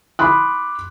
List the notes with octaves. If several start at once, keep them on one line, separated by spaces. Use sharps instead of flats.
B5 C6 D6 D#6 F#6